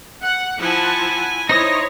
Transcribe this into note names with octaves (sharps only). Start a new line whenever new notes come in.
F#5
F3 E4 F#5 G#5 A5
D#4 E4 C5 C#5 D#6 A#6